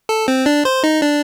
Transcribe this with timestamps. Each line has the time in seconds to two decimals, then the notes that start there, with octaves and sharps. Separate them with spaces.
0.09 A4
0.28 C4
0.46 D4
0.65 C5
0.84 D#4
1.02 D4